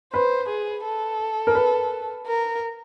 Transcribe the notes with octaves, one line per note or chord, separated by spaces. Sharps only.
B4 C5
G#4
A4
A#4
B4
A#4